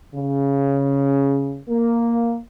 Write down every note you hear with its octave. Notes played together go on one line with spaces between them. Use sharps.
C#3
A#3